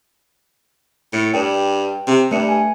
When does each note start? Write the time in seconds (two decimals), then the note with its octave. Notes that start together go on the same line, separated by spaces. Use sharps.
1.13 A2 C#7
1.34 G2 G5
2.07 C3
2.31 G2 A3 C#7
2.48 G#5